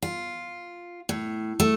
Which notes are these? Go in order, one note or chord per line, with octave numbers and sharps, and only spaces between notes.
F4
A2
A3